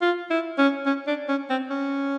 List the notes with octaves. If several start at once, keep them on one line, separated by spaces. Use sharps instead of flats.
F4
E4
C#4
C#4
D4
C#4
C4
C#4